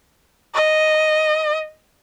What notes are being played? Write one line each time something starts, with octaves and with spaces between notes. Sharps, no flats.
D#5